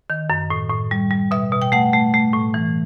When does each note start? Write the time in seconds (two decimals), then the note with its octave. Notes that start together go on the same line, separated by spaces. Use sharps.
0.10 D#3
0.30 F#2
0.50 A2
0.70 A2
0.91 G3
1.11 G3
1.31 B2 E5
1.53 B2
1.62 G5
1.72 A3 F#5
1.93 A3
2.14 A3
2.33 A2
2.54 E3